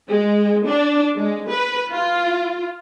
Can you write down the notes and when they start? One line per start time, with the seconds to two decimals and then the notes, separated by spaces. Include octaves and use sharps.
0.10 G#3
0.67 D4
1.18 G#3
1.50 B4
1.91 F4